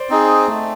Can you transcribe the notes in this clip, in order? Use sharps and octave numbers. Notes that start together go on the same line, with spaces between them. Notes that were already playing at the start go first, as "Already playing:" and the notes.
Already playing: C5 D5
C4 D#4 G#4
A3